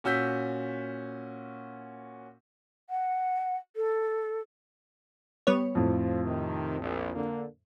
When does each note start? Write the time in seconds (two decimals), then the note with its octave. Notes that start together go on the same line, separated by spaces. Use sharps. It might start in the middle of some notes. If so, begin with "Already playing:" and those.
0.04 A#2 C#4 F#4 E6 G6 B6
2.89 F#5
3.76 A4
5.47 G3 B3 C#5
5.75 F2 A2 F3
6.24 C3 D#3
6.80 A#1
7.14 D3 A#3